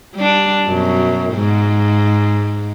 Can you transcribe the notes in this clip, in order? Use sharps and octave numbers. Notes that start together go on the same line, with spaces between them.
G3 D4
F#2 B2
G#2